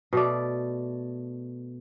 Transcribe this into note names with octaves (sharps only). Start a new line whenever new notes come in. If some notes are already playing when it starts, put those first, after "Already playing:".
B2 A3 D5